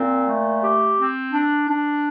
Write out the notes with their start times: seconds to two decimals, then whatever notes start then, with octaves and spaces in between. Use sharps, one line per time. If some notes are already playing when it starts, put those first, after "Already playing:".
Already playing: A#2 C4
0.28 A3
0.64 G4
0.98 C4
1.33 D4
1.69 D4